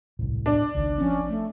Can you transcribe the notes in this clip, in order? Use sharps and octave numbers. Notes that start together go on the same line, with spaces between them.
D#1 C2 A2
D4
G#1 C#2 D#3
F3 C4 C#4
A3